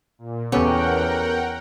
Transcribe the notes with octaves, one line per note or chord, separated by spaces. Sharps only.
A#2
E2 B3 C#4 G4 A4 A#4 F#5 G5